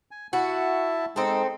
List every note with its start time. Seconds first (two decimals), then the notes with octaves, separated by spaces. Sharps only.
0.11 G#5
0.33 E4 F#4 E5 A5
1.16 G#3 C4 D#4 A4